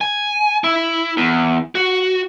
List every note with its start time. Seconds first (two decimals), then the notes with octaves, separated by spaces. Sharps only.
0.01 G#5
0.64 E4
1.17 E2
1.75 F#4